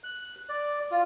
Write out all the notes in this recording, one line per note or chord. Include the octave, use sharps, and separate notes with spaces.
F#6
D5
F4